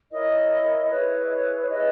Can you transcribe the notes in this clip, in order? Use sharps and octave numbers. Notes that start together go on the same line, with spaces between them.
E4 A#4 C#5 D#5
E4 G#4 B4 C#5
D#5
C#5
C#5
E4 G#4 B4 D#5